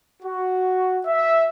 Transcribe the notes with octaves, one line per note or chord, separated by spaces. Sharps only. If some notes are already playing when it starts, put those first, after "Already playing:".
F#4
E5